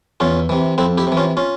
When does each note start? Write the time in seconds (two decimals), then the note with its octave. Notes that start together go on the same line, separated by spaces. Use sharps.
0.20 E2 C#4 F4
0.49 C3 E3
0.78 F2 C4 E4
0.98 E4 G4
1.07 C3 E3
1.17 C#4 F4
1.37 C#4 F4